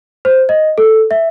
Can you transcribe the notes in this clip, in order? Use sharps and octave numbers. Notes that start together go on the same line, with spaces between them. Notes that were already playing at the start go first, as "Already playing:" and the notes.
C5
D#5
A4
E5